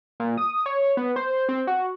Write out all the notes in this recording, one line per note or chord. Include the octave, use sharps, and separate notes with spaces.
A#2
D#6
C#5
B3
C5
C4
F#4